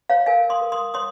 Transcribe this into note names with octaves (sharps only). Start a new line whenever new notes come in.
C#5 F5
A#4 F5 G#5
C6 D#6
A#4
C6 D#6
C#5 C6 D#6